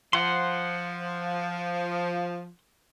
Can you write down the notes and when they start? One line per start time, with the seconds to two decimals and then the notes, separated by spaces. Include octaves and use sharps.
0.13 F3 F#5 C6